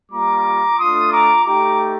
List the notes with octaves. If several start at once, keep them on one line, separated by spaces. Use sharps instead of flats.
G3 A#3 F4 A#5 D6
A3 D4 F4 C6 D#6
A#5 D6
A3 D#4 G4 A#5 D6